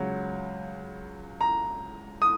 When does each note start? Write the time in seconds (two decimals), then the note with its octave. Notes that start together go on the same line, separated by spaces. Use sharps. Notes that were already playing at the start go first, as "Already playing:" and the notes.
Already playing: C#2 C#3 F#3
1.41 A#5
2.22 D#6